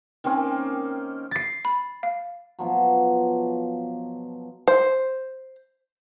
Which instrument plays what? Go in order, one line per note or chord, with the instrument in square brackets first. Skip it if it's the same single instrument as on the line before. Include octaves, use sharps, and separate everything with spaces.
[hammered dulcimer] D#3 A#3 C4 C#4
[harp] A6 C7
[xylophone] B5
F5
[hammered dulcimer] B2 F3 F#3
[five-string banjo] C5